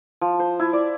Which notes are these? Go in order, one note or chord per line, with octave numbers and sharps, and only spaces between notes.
F3
C5
E4
D5